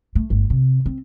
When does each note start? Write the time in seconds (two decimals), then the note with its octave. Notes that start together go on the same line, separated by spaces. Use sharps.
0.15 A3
0.30 G1
0.50 C3
0.86 C4